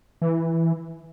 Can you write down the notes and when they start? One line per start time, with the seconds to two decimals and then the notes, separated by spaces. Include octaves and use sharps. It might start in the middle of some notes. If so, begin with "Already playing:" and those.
0.22 E3